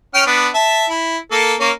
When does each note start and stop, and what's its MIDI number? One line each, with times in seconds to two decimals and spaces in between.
0.14 0.23 61
0.14 0.23 79
0.14 0.23 89
0.27 0.48 59
0.27 0.48 62
0.54 0.86 76
0.54 0.86 81
0.89 1.17 64
1.31 1.54 58
1.31 1.54 69
1.60 1.70 58
1.60 1.70 61